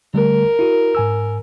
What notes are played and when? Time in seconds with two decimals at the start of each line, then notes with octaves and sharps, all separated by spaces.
0.14 D3 G3 A3 A#4
0.59 E4 F#4
0.95 G#2 G#5 E6